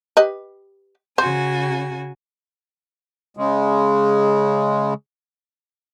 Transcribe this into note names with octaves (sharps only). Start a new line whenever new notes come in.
G4 B4 D#5
C#3 F#4 C5 G#5
C#3 G#3